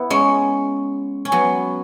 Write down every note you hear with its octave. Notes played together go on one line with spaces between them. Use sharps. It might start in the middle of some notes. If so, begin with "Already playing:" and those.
Already playing: B3 E4
G#3 C#4
C#4
F#3 B3